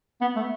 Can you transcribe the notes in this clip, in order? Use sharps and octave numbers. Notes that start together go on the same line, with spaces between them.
B3
A3